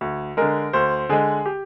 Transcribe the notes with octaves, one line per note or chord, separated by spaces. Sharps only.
D2
D3 G#3 A#4
D2 C5
D3 G#3 G#4
G4